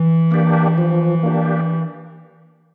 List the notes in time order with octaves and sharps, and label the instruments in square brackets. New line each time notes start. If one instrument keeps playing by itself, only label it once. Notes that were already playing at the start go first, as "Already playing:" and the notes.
Already playing: [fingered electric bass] E3
[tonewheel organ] A#3 D4 G4
F3
A#3 D4 G4